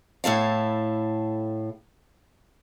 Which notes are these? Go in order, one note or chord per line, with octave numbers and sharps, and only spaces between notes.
A2 E4 A4 F5